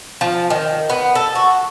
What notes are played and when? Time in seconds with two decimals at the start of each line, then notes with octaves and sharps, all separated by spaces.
0.21 F3
0.50 D#3
0.90 B3
1.15 A4
1.35 F#4